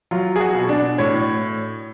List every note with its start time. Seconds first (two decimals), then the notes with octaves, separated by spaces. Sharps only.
0.11 F#3 F4
0.36 G#4
0.40 F#4
0.54 B2
0.69 D4
0.98 A2 C#5